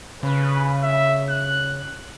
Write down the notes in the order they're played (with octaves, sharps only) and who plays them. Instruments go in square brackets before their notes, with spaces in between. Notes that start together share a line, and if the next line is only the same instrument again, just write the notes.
[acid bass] C#3 [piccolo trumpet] B4
[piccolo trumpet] E5
F#6